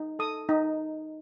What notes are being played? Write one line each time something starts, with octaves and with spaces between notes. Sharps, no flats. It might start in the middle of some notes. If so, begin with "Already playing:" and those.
Already playing: D#4
A4 D#6
D#4